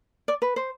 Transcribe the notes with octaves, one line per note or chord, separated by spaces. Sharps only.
D5
B4
C5